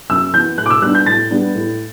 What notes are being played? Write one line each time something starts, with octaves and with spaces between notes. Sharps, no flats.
F#2 E6
E3 B3 G6
A2 F#6
D6
E6
G3 B3 D4 F#6
G6
A2 A6
G3 B3 D4
A2